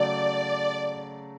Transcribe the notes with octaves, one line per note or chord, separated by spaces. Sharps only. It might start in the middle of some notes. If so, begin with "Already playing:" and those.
Already playing: C#3 F#3 A3 D5